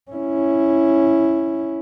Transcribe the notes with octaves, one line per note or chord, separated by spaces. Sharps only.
C#4 E4